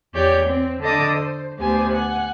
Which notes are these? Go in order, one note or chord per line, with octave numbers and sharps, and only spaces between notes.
E2 G4 C#5 D5 G6
C4
D3 A4 D#5 D6 D#6
C5
D2 B3 G4 C5 G#5
F#5 G#5